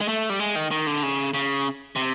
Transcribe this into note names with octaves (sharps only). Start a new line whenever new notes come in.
G#3
A3
G3
G#3
D#3
D#3
D3
C#3
C#3
C3